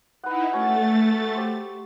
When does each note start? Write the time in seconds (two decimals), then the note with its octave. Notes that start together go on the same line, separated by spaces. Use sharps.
0.24 D#4 E4 B4 F#5
0.53 A3 C#4 F#4 C#5 A6
1.34 G4 C5 C#6